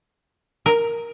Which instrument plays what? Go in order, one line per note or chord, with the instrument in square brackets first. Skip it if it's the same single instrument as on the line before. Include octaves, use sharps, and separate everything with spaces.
[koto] A#4